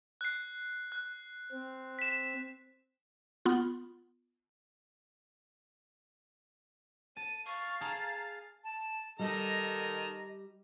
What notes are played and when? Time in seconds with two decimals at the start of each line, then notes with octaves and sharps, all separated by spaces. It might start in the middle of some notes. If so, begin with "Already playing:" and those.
0.21 F#6 C7
0.92 F#6
1.52 C4
1.99 B6 E7
3.46 B3 F4
7.17 A5 D#7
7.46 F5 C#6 A6
7.81 G#4 A5 A#5
8.64 A5
9.19 D#3 G3 A4 D#5 A#5